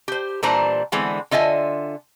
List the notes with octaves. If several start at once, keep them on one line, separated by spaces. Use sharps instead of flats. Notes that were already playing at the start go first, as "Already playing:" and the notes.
G4 C5
A#2 E3 G3 D4 C5 A#5
D3 E3 G#3 B3 C4
D3 F4 D#5 E5 G#5